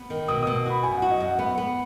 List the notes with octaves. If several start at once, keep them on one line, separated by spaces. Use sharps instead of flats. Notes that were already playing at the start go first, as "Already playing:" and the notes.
Already playing: B3
D#3
B2 D#6
D#6
B2
D#6
F#4 B5
F#2 G#5
F#4 F#5
D#5
F#2 F#5
B3 F#5
B3